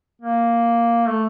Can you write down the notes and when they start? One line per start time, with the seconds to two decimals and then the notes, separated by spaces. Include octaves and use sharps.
0.22 A#3
1.08 A3